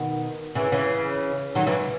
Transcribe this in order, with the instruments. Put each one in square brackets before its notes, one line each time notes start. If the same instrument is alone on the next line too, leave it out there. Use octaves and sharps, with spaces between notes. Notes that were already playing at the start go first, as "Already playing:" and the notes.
Already playing: [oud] B2 D#3
C#3 E3
C#3 E3
D#3 F#3
C#3 E3